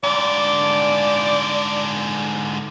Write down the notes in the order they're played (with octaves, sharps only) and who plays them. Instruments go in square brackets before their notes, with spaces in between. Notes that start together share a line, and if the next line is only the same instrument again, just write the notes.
[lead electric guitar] G#2 D3 [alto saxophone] D5